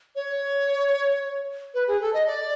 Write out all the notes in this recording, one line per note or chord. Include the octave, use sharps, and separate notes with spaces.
C#5
B4
G#4
A4
D#5
D5